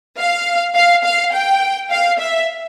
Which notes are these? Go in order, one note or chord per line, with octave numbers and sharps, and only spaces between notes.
F5
F5
F5
G5
F5
E5